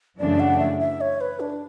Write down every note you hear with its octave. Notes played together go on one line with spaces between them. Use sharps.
F#2 C#3 E3 A3 D4 D5
F#5
E5
E5
C#5
B4
D4